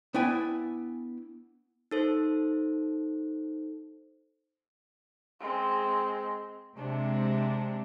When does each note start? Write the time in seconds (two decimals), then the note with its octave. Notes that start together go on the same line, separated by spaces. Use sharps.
0.14 B3 D4 E4 G5 G#5
1.91 D#4 A4 C5
5.40 G#3 C4
6.77 C3 G#3 D4